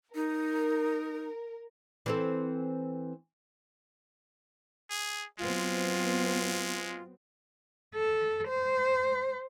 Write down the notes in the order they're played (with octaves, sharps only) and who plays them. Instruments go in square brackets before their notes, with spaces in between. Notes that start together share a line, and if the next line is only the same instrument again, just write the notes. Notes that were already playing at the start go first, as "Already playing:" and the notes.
[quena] D#4 [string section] A#4
[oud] E3 C4 A4
[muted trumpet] G#4
[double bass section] F#3 B3 C4 [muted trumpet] G#3 [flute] F4
[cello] A4
C5